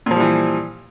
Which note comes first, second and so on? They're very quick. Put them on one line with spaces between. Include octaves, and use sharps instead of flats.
A#2 F3 G3 E3